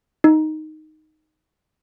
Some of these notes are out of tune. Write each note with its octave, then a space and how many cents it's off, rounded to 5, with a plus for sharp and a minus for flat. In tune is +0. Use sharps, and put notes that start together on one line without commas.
D#4 +0